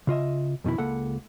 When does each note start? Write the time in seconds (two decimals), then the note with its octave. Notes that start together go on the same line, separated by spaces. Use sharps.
0.07 C#3 F4 D#5 E5
0.64 F2 B2 D#3 E4
0.78 C#2 A#3 A4 F#5 B5